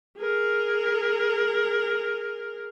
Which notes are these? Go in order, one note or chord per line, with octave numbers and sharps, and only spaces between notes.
G#4 A#4